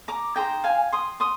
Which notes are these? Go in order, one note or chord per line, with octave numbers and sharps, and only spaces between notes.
A#5 D6
D#4 G#4 C5 G5 A#5
F5 G#5
C6 D#6
C6 D#6